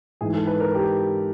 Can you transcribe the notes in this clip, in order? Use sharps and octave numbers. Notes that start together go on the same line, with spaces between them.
G#2 E3 G#3 G#4
A4
B4
A#4
G4